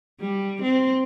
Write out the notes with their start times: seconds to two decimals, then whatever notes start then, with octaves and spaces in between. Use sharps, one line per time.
0.21 G3
0.62 C4